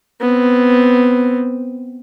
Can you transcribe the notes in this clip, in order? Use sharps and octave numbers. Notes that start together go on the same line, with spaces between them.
B3 C4